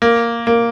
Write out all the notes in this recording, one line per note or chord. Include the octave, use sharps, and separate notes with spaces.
A#3
A#3